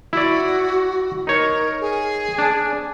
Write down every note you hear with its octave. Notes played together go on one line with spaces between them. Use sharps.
E4 F#4 D5
D#4 A#4 C#5
G#4
D4